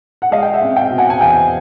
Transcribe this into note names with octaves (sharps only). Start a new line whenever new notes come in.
F#5
G#3 D#5 F5
G5
E5 F#5
C4
F5 G5
B2
F#5 G#5
G#5
E2 F5 G5